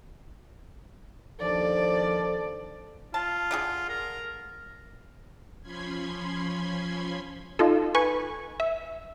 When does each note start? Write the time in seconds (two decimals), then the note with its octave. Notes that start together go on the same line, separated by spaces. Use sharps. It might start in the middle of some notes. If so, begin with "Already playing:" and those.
1.41 D#2 F3 D4 A4 D5
3.14 F4 A5
3.51 D3 D4 G#4
3.89 A#4
5.62 F3 C#4 B5 C6 G#6
7.59 D#4 F4 A4
7.95 B4 G#5 C#6
8.60 E5